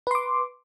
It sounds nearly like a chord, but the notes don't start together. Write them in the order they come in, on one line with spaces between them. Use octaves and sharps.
B4 C6 D6